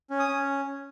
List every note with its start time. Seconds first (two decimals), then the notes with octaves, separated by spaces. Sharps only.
0.10 C#4
0.19 D#6
0.28 C#4